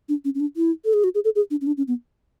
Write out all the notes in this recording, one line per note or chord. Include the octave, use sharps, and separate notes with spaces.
D4
C#4
C#4
D4
E4
A4
G#4
F#4
G#4
A4
G#4
D4
C#4
D4
C#4
B3